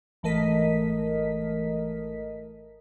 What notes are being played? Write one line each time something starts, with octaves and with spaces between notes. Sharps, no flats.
G#1 E3 A3 A#4 D#5 B6